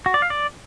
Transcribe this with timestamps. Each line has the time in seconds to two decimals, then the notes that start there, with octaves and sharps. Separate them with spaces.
0.06 F#4
0.14 D5
0.22 F5
0.30 D5